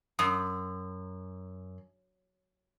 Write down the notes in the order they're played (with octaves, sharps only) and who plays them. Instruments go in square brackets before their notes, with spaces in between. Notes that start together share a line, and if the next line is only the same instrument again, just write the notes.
[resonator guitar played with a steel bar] F#2 [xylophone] D#6